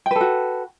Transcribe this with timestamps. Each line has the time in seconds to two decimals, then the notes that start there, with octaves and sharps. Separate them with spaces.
0.06 G5
0.11 B4
0.16 A4
0.21 F#4